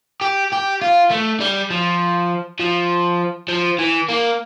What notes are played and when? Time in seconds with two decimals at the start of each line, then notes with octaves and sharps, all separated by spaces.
0.22 G4
0.52 G4
0.82 F4
1.11 A3
1.40 G3
1.70 F3
2.60 F3
3.49 F3
3.79 E3
4.09 A#3